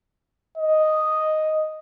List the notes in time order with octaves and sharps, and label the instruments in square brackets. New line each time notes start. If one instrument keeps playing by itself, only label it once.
[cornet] D#5